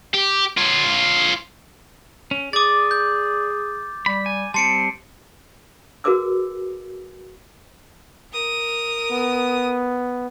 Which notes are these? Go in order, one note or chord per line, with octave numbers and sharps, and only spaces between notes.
G4
F4 C#5
C#4
G#4 D5 D6 D#6 A6
G6
G3 B5
G#5
G3 C4 A5 C6 C#7 D7
F#4 G#4 A#4 B4 D6 E6
A#4 D#6
B3